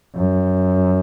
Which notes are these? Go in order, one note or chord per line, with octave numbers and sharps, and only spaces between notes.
F#2